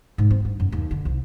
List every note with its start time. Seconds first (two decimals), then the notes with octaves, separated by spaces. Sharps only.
0.18 G#2
0.31 C4
0.45 G2
0.60 F#2
0.72 D#2
0.91 D3
1.05 C2